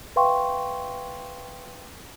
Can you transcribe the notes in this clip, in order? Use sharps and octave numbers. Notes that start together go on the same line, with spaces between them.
B4 E5 F5 G5 C6 C#6